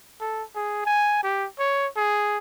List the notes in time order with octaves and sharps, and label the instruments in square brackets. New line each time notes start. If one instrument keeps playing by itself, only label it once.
[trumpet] A4
G#4
G#5
G4
C#5
G#4